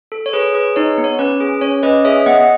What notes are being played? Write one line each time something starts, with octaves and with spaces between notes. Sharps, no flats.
A4
C#5
G#4 B4
G#4 B4
D#4 C#5
B3
C#5
C#4 B4
G#4
C#4 C#5
C#4 B4 D#5
G#4 C#5 E5
B3 D#5 F#5